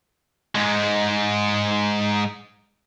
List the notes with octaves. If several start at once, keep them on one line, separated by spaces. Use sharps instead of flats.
G#2 G#3